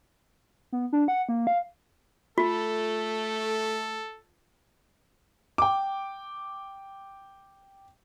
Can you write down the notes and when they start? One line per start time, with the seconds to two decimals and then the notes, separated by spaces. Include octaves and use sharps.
0.72 B3
0.93 D4
1.08 F#5
1.29 A#3
1.47 F5
2.38 A3 F4 A4
5.58 G5 D6